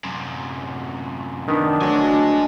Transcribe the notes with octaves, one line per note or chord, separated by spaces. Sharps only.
F#2 C3
D#3 B3 D4
D2 F#3 D#5 G#5